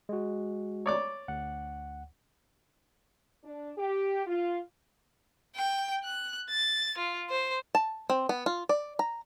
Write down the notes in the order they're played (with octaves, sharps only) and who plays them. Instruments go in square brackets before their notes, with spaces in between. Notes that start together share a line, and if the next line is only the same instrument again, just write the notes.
[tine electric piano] G#3 F#4
[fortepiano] C#5 D5 D6
[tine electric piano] D2 F#5
[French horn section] D4
G4
F4
[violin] G5
F#6
A6
F4
C5
[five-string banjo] A5
C4
B3
F4
D5
A#5